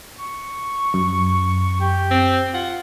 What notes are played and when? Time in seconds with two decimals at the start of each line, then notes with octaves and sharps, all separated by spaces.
0.18 C#6
0.94 F#2
1.81 G4
2.11 C4
2.54 F4 F#5